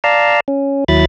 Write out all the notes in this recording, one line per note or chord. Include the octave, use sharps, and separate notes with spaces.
D5 F5 A5 A#5
C#4
D#2 F#3 E4 B5 A6